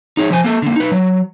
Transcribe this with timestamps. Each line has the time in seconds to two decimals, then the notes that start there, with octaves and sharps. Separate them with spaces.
0.17 D#4 G#4 C#5
0.30 F3 C5 G#5
0.44 A#3 A4
0.62 D3 A#3
0.76 D#4 B4
0.92 F#3